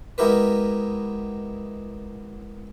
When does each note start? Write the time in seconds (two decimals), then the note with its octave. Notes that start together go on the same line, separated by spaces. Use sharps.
0.18 G#3 B3 E4 G4 A#4 B4